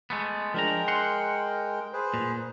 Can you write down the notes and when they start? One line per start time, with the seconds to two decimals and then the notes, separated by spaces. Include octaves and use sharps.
0.10 G#3 A3 B3
0.54 F3 G#3 D4 A#4 G5 A#5
0.88 F#5 C6
1.93 G#4 B4 C5
2.14 A#2